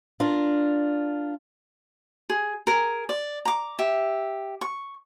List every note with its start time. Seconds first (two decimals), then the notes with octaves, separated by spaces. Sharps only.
0.20 D4 F4 A#4
2.30 G#4
2.67 G#4 A#4
3.09 D5
3.45 A#5 D6
3.79 G4 E5
4.61 C#6